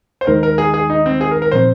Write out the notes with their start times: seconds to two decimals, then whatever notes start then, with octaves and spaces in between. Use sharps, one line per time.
0.21 C5
0.27 D#2 D#3 G#3 D#4 A#4
0.43 A#4
0.58 G#4
0.74 G#4
0.90 D#4
1.06 C4
1.21 G#4
1.31 A#4
1.42 A#4
1.52 A#2 F3 C4 C5